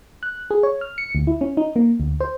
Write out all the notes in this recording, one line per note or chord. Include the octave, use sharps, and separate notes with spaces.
F#6
G#4
C#5
F6
C#7
D2
E4
C#4
D#4
A#3
D2
C5